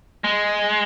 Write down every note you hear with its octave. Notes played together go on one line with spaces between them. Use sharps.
G#3